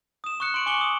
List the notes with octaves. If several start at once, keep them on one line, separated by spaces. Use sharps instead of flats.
D#6 E7
C#6 D#6 F#6 C#7
C6 C#6 D7 F#7
G#5 C#6 D6 C#7 G7
D#6